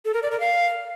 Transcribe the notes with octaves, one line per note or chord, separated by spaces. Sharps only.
A4
A#4
D5
A#4
F5